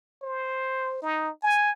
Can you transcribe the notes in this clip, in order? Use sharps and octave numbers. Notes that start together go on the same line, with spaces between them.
C5
D#4
G#5